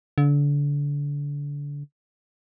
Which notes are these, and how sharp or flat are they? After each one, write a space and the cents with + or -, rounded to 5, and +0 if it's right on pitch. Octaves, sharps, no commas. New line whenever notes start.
D3 -30